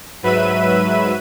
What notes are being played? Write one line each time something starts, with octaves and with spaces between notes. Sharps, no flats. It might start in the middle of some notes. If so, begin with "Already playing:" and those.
G#2 F#3 B4 E5 D#7